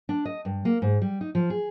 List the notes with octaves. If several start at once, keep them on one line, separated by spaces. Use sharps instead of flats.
D4
D#5
G2
A#3
G#2
G3
D#4
F3
G#4